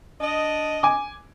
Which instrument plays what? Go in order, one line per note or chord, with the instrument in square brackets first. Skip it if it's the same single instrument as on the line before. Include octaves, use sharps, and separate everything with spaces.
[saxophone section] D4 D#5
[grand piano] G#5 D6